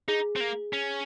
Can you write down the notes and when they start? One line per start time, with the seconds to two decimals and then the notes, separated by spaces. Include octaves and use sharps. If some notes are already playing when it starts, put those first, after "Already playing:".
0.08 D#4 G#4
0.36 C4
0.40 A#3
0.73 C#4